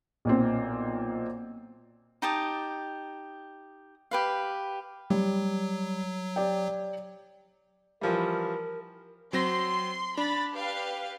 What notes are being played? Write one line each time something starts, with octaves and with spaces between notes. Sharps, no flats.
B1 A#2 C4
D#4 G4 A5 D#6
G4 B4 F5
F#3 G3
G4 D5 G5
E3 F3 G3 A#4
F#3 C4 C6 A#6
D4 B5 A6
G4 B4 F5